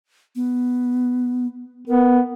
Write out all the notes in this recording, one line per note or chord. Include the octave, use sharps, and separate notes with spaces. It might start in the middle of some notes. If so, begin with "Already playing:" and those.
B3
B3 A#4